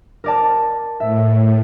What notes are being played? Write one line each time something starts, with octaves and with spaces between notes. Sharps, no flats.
A#4 D5 A5
A2 E5